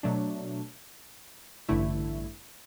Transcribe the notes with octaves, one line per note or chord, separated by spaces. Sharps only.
B2 F#3 A3 D4
A1 G2 D3 A3 E4